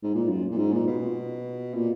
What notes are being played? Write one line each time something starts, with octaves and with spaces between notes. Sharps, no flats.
G#2
A#2
F#2
A#2
G#2
A#2
B2
A#2